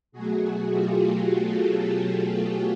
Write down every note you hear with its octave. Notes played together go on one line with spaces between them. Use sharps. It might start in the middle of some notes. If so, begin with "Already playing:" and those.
B2 F#3 A3 F#4 G#4
F4 G4
G4 A4